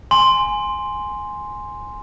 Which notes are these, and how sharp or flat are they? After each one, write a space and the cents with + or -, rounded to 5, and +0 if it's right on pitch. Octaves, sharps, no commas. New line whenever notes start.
G#5 +0 C6 +0